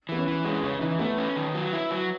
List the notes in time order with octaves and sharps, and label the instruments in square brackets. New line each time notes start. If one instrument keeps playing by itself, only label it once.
[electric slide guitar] E3 [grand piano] B3
[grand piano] C#4
[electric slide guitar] E3
[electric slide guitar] G#3 [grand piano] C#4
[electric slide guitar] C#3 [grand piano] C#4
[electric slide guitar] E3 [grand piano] D#4
[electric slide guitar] A3 [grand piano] B3
[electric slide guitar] C#4
D#3
F#3
E4
F#3